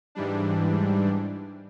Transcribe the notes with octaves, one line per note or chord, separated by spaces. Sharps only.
G#2 E3 G3 D4